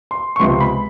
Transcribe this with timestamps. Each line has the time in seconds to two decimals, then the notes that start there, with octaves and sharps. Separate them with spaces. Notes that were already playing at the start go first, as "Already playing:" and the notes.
0.11 C6
0.36 C#6
0.40 C#2 C3 F3 G#3 B3 C6
0.60 B5